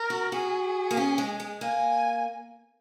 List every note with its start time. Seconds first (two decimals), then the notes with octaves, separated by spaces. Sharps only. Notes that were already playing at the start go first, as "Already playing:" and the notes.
Already playing: A#4
0.10 F#4
0.32 F#4 G#4
0.91 A#3
0.97 C#4
1.18 G#3
1.40 G#3
1.61 A#3 G#5